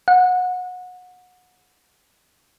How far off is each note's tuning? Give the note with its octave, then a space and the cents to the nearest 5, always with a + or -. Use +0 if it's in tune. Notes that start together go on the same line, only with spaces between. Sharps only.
F#5 -25